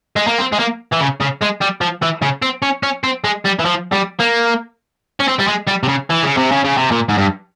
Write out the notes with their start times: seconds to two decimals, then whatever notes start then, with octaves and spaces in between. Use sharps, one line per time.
0.16 G#3
0.27 A#3
0.38 C4
0.52 G#3
0.59 A#3
0.92 E3
1.00 C#3
1.20 C#3
1.41 G#3
1.61 G3
1.81 F3
2.02 E3
2.22 C#3
2.42 C4
2.62 C#4
2.83 C#4
3.04 C4
3.24 G#3
3.45 G3
3.59 E3
3.65 F3
3.93 G3
4.20 A#3
5.20 C#4
5.28 C4
5.40 G3
5.48 G#3
5.68 G3
5.83 C3
5.88 C#3
6.10 E3
6.23 C#3
6.37 C3
6.51 C#3
6.64 C#3
6.77 C3
6.91 A#2
7.09 G#2
7.18 G2